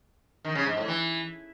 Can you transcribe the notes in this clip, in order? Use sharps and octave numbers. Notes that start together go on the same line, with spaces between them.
D#3
C#3
G#2
A2
E3